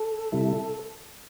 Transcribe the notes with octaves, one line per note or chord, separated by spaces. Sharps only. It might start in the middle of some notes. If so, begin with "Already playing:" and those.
Already playing: A4
C3 G3 E4